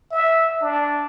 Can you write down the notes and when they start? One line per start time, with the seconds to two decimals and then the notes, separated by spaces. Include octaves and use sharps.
0.12 E5
0.62 D4